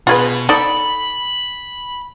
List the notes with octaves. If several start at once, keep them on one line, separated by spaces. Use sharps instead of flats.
B2 F4 G#4 B4
D#4 A4 D5 B5